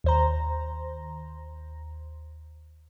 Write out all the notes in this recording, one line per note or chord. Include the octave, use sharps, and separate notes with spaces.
D#2 C5 A#5